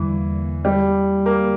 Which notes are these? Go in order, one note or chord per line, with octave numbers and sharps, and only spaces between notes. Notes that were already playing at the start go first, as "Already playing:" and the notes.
Already playing: E2 D3 E3 G3 A#3
G3
A#3